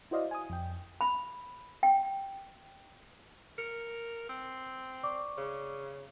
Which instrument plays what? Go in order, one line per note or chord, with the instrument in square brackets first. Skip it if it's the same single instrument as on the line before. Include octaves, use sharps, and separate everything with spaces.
[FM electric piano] E4 F#4 C5 D5 D#5 F5
G#5 D#6
F2 G5
[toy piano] B5
G5
[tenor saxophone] A#4 [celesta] C#7
[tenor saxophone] C4
[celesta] D5 C#6 D6
[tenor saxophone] C#3